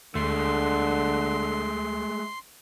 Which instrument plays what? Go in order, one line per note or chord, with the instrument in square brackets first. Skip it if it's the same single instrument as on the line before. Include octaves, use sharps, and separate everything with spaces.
[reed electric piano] D2 [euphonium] D3 [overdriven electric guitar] G#3 A3 [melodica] C6